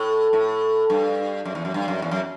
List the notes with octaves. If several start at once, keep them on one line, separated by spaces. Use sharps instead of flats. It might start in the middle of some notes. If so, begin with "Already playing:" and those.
Already playing: A2
A2
G2
F#2
E2
F#2
G2
F#2
E2
F#2